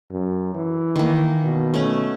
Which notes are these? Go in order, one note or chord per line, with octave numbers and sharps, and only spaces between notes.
F#2
E3
D#3 A#3
B2
A3 C#4